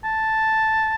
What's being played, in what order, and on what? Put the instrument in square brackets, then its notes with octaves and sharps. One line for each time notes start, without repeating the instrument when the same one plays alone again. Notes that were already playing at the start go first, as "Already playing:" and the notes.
[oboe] A5